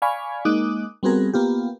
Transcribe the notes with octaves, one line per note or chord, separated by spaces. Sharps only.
D5 F5 G#5 B5 C#6
G#3 A#3 D#4 D6 D#6 F#6
G3 B3 C4 F#4 G#4 A#4
A#3 B3 F4 G4